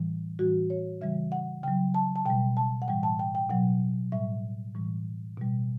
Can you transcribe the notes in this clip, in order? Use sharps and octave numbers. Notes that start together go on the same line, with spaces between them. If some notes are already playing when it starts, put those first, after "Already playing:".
Already playing: A2 E3 G3
A2 E3 G3 F#4
C#5
C#3 E3 G3 E5
F#5
C#3 F#3 G5
A5
A5
B2 G3 G5
A5
F#5
A2 E3 G3 G5
A5
G5
G5
B2 F#3 F#5
A2 G3 E5
A2 E3 G3
B2 G3